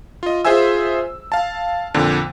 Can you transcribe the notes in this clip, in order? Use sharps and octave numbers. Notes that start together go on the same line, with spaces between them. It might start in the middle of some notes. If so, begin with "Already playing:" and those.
F4 D#5
F4 G#4 C5 E5 G#5 E6
F5 A5
F2 A#2 D3